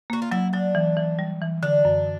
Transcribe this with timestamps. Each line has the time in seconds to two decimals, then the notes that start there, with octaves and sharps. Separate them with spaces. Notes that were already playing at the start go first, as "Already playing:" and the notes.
0.10 A#3 F#4
0.22 F4
0.31 F#3 E4
0.53 F#3 D4
0.75 E3
0.97 E3
1.19 G3
1.42 E3
1.63 D3 D4
1.85 F#2